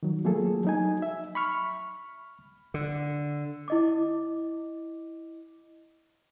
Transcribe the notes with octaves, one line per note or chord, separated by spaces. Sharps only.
D#3 F#3
F3 F#3 A3 A#3 G#4 A4
F#3 D#4 G#5
E5
B5 C#6 F6
D3
E4 D#5 D6